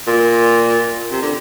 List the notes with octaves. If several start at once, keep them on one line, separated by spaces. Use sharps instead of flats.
A#2
C3
D3